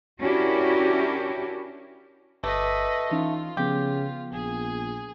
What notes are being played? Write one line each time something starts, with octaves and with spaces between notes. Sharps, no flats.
C#4 D4 E4 F#4 G4 A#4
G1 A3 B4 D#5 D6 A#6
E3 C#4 D#4 F4
C#3 F3 B3 G4
A#1 G#4